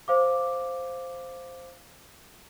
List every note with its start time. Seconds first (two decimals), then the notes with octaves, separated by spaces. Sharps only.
0.08 C5 F5 D6